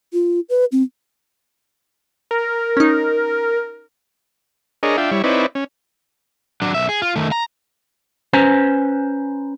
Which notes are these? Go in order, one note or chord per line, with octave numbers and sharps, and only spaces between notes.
F4
B4
C4
A#4
C#4 D#4
D4 G#4 A#4 C#5 D#5
D4 F4 E5 G5
G3 E4 C#5
C4 D#4 E4 B4 C#5 D5
C#4
F#3 D4
B1 E5
G#4
F4
D#3 A3
A#5
C#4 B4 C5 G#5 A#5